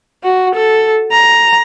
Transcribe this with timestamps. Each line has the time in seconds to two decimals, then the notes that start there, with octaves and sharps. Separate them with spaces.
0.23 F#4
0.56 A4
1.12 A#5